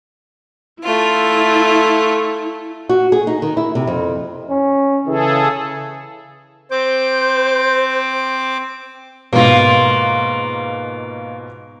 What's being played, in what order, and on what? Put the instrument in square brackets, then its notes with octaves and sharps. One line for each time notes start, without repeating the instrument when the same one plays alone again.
[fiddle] A3 F4 [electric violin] E4
[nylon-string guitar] F#4
G#4
D#4
D#3
E4
C3
F2
[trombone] C#4
[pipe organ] C#3 G#4 A4 [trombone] E3
[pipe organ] C4 D6 [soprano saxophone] C5
[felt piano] G#2 B2 [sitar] A#3 F4